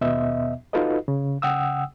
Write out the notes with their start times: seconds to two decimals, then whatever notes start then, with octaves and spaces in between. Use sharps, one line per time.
0.01 D#2 B2 B3 D#5 E5
0.73 D#4 F4 F#4 A4 B4 D#5
1.08 C#3
1.42 C#3 F#5 G5 D#6 E6